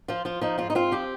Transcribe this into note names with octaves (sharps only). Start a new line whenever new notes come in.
F3 F4
F3 F4
F3 D#4
G#2 F4
D#4
C4 F4
F3 G4